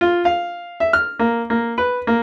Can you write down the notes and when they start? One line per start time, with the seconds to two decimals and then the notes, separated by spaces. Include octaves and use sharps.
0.01 F4
0.25 F5
0.80 E5
0.93 F6
1.19 A#3
1.50 A#3
1.78 B4
2.07 A#3